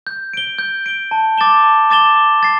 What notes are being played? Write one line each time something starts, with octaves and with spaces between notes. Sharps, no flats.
G6
D7 G7
G6
D7 G7
A5
D6 A6 E7 G7
A5
D6 A6 E7 G7
D6
A6 C7